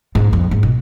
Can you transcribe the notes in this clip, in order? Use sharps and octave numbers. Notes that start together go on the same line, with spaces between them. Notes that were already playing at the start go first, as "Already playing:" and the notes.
G#2
F2
G#2
B2